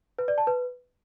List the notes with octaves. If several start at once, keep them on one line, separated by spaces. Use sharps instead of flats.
B4
D5
A5
B4